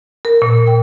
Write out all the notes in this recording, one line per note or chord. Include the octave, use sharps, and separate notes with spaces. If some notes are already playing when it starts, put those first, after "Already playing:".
A#4
A#2
G5